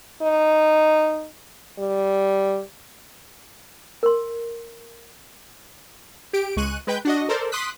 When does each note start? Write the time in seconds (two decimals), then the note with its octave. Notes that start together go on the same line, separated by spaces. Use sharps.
0.22 D#4
1.78 G3
4.03 A#4 C6
6.33 G4 D7
6.56 C#2 G#3 C#6 F#6 D#7
6.87 G#3 B4 G5 G6
7.05 D4 F#4 D#5
7.29 A4 A#4 C5 D5
7.52 C6 D6 D#6 F#6 B6